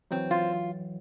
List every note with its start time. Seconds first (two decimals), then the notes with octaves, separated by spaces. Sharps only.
0.11 E3 F#3 C4
0.31 F4